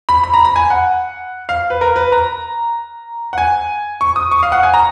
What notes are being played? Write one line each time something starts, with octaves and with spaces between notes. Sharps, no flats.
B5
B5
A#5
B5
G#5
F#5
F5
B4
A#4
B4
A#5
F#5
G#5
C#6
D#6
C#6
F5
F#5
G#5
A#5